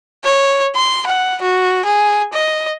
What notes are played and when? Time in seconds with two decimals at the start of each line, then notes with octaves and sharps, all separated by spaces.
0.24 C#5
0.76 C6
1.07 F#5
1.42 F#4
1.85 G#4
2.33 D#5